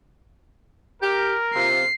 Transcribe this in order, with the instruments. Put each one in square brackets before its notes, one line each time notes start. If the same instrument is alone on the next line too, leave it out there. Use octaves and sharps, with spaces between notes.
[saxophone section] G4 [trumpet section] A#4
[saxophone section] C3 F4 [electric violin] C7